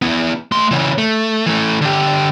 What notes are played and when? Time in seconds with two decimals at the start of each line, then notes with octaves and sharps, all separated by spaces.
0.02 B3 E4
0.52 A3 C6
0.71 C#3 E3
0.98 A3
1.46 E3 A3
1.81 D3 G4